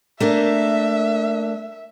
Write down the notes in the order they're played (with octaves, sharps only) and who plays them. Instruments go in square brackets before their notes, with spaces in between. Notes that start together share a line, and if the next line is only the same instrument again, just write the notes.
[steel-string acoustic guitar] A3 A#3 D4 [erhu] E5